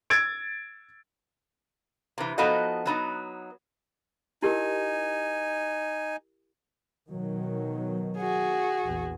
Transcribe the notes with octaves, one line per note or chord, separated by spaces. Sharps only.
E6 G#6 A6 D7
C3 E3
F3 B3 D#4 F#4 A4 D#5
F#3 B3 D#4
D#4 E4 G4 A#4 G#5
B2 D#3 F#3
F#4 G#4
A#1 E2